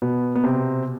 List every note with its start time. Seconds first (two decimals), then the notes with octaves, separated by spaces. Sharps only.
0.02 B2 B3
0.35 B3
0.44 C3 C4